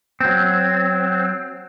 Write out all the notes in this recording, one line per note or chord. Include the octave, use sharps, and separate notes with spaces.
F#3 C4